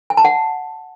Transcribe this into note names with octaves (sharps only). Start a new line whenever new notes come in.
G#5
A5
F#5